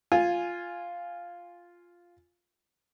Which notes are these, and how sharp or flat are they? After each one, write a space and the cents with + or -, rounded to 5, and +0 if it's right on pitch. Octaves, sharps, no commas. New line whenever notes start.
F4 +0 G#5 +0